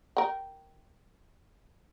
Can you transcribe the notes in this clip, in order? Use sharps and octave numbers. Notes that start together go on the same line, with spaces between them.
A#4 G5